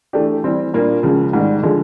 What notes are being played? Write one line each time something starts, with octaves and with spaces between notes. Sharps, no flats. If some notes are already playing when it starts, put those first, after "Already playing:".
E3 A3 D4 G4
E3 G3 C4
A#2 G3 A#3 D4 F4
C#2 C#3 F3
G#2 D#3 G3
D3 F3 G#3